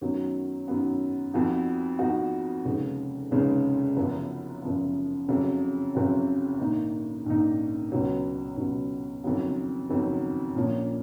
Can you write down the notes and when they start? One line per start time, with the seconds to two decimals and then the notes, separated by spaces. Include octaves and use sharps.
0.01 F#2 D#3 F#3 B3
0.68 F#2 D#3 F#3 B3
1.34 F2 F3 B3 D#4 F#4
1.99 F2 F3 B3 D#4 F#4
2.65 F1 D#2 C#3 G#3
3.31 F1 D#2 C#3 G#3
3.97 F#1 F#2 F3 B3
4.63 F#1 F#2 F3 B3
5.28 F#1 F2 C#3 F#3
5.95 F#1 F2 C#3 F#3
6.60 A#1 G#2 D#3 A#3 D#4
7.26 A#1 G#2 D#3 A#3 D#4
7.92 C#2 B2 F#3
8.58 C#2 B2 F#3
9.24 F#1 F2 D#3 F#3 B3
9.90 F#1 F2 D#3 F#3 B3
10.55 A#1 A#2 F3 A#3 C#4